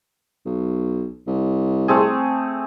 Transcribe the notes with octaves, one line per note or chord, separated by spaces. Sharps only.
B1
C2
A3 C4 G#4